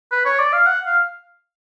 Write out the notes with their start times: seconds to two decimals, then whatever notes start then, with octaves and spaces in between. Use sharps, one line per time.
0.12 B4
0.26 C#5
0.39 D5
0.53 F5
0.66 F#5
0.86 F5